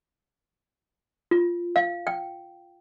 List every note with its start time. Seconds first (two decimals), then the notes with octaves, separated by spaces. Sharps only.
1.31 F4
1.76 F5
2.07 G5